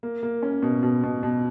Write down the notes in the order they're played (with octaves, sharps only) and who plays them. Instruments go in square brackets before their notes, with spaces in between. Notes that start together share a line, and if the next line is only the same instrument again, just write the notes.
[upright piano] A#3
A#3
C#4
B2
B2
B2
B2